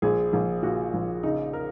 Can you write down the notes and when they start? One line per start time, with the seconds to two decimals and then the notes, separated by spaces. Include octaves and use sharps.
0.02 A#1 G#4
0.33 A#1
0.63 A#2 F#4
0.94 A#1
1.23 C#3 D#4
1.53 A#4